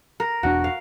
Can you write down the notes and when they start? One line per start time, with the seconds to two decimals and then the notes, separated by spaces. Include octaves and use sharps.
0.20 A#4
0.43 E1 E2 D4 F#4
0.64 F5